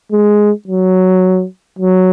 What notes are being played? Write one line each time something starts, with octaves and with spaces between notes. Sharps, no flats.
G#3
F#3
F#3